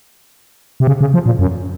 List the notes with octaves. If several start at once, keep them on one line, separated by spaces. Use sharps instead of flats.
C3
C#3
C#3
F3
A#2
F#2